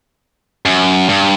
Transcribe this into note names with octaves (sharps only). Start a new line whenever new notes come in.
F#2
G2